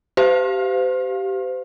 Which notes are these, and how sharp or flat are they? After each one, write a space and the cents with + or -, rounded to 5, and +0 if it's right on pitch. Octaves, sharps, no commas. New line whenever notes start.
G4 -20 C5 -40 F5 +0